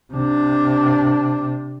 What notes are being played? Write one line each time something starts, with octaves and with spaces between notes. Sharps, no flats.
C3 D4